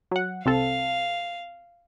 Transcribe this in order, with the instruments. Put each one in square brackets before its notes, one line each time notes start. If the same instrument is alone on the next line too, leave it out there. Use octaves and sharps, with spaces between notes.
[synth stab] F#3 F#5
[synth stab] C2 C4 A4 [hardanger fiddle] F5